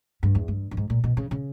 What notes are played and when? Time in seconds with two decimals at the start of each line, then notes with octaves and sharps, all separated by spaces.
0.23 G2
0.35 E2
0.48 G2
0.71 G2
0.77 G#2
0.90 A#2
1.04 B2
1.17 C#3
1.31 C#3